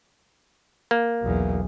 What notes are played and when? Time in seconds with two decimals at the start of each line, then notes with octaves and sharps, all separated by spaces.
0.91 A#3
1.22 B1 E2